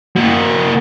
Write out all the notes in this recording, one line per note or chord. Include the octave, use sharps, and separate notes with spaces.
A#3 F#4